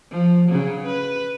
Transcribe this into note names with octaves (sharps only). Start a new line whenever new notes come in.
F3
C#3 F#3
B4